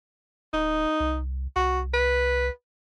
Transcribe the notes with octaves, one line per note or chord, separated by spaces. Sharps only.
D1 D#4
C2
C2 F#4
B4